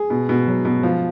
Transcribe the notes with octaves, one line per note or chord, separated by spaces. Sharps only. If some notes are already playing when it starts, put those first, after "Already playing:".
Already playing: G#4
B2
B2
F#3
B2
F3